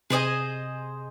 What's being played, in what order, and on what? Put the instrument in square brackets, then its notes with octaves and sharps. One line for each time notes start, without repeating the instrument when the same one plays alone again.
[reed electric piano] C3 [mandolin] G#4 C5 D#5 G#5